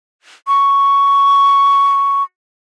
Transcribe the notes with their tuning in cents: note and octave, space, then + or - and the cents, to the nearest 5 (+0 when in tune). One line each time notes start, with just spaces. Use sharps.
C#6 +5